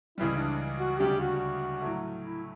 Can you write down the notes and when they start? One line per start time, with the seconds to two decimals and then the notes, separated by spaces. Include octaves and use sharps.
0.18 C#2 C#3 E3 G3 E4
0.38 D4
0.80 F#4
0.99 D2 C#3 G3 D4 G4
1.20 F#4
1.82 A2 F#3 A3
2.24 E4